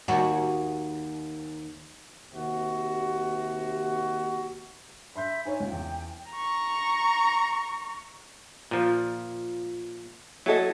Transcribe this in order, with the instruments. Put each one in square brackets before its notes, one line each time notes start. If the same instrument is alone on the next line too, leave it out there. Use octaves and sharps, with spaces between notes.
[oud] D#2 F#4
[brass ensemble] D#2 C3 F#4
[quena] E5 [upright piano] B5 C6 G6
[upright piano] D#4 C5 C#5 [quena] G#5
[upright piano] C#2 [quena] G5
[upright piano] E2
[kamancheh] A#5 C#6
[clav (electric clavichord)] A#2 F3
[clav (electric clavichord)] F#3 [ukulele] E4 A4 D#5